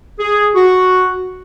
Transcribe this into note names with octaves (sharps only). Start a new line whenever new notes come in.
G#4
F#4